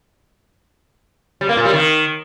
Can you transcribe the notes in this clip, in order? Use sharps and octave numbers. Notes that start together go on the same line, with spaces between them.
G3
A#3
A#2
G3
D#3